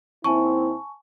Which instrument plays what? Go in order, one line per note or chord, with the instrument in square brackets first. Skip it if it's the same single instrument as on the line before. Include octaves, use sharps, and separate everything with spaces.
[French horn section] D#2 C4 E4 [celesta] G#5 A5 C#6